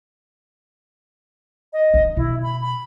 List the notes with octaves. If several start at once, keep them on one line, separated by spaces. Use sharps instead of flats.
D#5
D#3
B2 E4
B5
B5